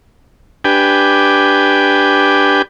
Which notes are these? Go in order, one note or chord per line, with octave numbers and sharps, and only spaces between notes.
D4 G4 B4 G5 G#5